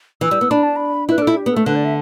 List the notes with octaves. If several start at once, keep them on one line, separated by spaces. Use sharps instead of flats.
E3 E6
G3
B3
D4 B5
A5
B5
E4 B4
D4
A4
E4
G4
B3
A3 A4
D3 B4
D5
E5